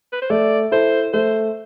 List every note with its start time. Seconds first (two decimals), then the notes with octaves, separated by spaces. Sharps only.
0.13 B4
0.22 C5
0.30 A3 D5
0.71 E4 A4 C5
1.13 A3 C5